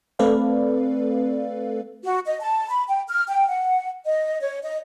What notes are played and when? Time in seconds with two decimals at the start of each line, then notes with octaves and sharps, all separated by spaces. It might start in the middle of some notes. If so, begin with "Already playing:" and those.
0.19 A3 C4 A4 B4 D5 F5
2.04 F#4
2.26 D#5
2.40 A5
2.70 B5
2.89 G5
3.08 F6
3.28 G5
3.47 F#5
4.05 D#5
4.41 C#5
4.63 D#5